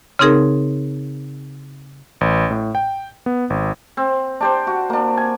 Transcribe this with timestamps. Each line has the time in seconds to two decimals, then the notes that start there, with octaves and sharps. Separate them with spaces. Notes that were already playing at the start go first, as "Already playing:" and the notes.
0.19 C#3 C4 D#4 G#4 A#4
2.21 A1
2.51 A2
2.75 G5
3.26 B3
3.50 G#1
3.97 C4
4.40 D4 G4 C5
4.67 F#4
4.90 A#3 D4
5.17 G#5